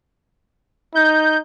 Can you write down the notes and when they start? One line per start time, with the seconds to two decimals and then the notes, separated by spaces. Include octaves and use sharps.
0.95 D#4 G6